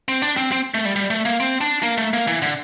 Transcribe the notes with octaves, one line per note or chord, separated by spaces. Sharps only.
C4
D4
C4
C4
A3
G3
G3
A3
A#3
C4
D4
A#3
A3
A#3
E3
D3